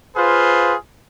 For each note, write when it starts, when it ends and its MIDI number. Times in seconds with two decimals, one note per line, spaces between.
0.16 0.75 65
0.16 0.75 68
0.16 0.75 71
0.16 0.75 72
0.16 0.75 77